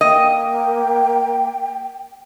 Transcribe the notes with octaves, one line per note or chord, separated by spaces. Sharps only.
A#3 D#5 G5